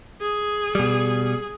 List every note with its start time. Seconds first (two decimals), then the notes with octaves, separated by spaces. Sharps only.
0.21 G#4
0.75 B2 G3